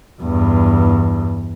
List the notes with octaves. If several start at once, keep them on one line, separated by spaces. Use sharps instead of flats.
E2 G2